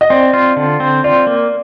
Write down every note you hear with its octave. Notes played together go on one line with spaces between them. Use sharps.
D#5
C4 D5
F4
D3
C4
F4 D5
A#3